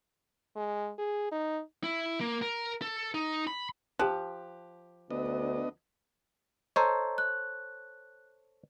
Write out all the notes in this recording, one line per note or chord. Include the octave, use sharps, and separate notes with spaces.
G#3
G#4
D#4
E4
A#3
A#4
A4
D#4
B5
F3 G4 F#6
D2 B3 D4 D#5
A4 C5 C#5 D#5 A#5
F#6